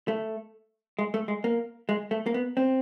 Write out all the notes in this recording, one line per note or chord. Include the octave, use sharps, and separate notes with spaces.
A3
G#3
A3
G#3
A#3
G#3
A3
A#3
B3
C4